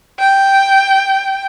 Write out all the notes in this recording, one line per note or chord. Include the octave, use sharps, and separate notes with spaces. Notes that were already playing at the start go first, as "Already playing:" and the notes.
G5